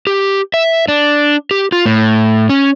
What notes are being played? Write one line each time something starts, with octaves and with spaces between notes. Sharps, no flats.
G4
E5
D4
G4
F4
A2
C#4